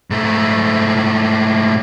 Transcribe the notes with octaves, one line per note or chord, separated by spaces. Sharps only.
G#2 A3